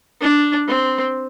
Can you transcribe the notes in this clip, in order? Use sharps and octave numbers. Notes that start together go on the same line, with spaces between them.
D4
C4